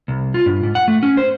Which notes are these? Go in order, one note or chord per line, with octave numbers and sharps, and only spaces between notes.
C2
F4
G2
G#2
F#5
A3
C#4
C5